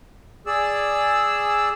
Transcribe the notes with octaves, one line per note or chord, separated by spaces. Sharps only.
G#4 D5 E6